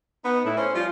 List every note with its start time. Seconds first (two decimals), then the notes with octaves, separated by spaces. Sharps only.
0.25 B3 D#4
0.45 A2 E4
0.57 C#4 C5
0.74 F3 G3 F4